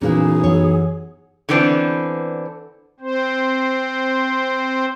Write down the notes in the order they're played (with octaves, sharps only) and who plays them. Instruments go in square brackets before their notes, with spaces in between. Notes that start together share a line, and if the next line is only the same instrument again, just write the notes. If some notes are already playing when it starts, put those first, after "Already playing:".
[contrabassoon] B1 [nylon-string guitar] A#2 C#3 E3 [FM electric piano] C#4 [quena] G#4
[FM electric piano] F#2 E3 F#5 [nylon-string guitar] C#5
[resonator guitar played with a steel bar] D3 E3 B3 C4 D4
[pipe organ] C4 C5